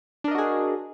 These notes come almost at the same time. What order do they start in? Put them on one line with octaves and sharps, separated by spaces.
D4 A#4 D#5 F#4 G#4